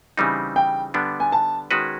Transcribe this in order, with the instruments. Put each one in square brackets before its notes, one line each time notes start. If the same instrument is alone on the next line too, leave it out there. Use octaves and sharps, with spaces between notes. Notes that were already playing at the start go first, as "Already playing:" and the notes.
[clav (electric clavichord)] C#3 E3 G3 C4 D#4
[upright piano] G5
[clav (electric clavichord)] D3 G3 B3 D4
[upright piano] G#5
A5
[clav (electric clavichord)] D#3 G#3 C#4 F#4 B4